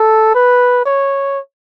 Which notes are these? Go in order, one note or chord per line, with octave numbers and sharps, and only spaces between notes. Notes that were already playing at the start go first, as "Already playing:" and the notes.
Already playing: A4
B4
C#5